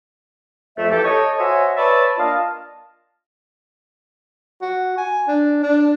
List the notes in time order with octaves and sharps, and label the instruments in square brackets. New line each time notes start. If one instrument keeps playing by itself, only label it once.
[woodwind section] F2 A3 E5
E3 G4 A4
A4 C#5 D#5
F#4 C5 C#5 D#5 E5 G#5
B4 C#5 D5 E5 A5 B5
A#3 D4 F4 D#5 F5 A5
[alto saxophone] F#4
G#5
D4
D4